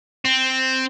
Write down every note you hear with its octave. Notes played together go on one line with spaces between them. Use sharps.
C4